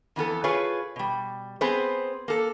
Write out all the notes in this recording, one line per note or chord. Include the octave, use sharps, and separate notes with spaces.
F2 E3 B3 A4
F4 G#4 B4 C#5
B2 G3
B3 C4 G#4 B4 C5
A#3 A4